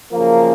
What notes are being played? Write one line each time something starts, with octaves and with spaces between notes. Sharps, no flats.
F#2 C#3 F3 A#3